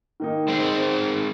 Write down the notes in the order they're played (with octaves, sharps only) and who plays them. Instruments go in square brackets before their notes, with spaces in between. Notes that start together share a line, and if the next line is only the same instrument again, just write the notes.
[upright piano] D#3 A#3 D#4
[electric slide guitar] G#3 C4 C5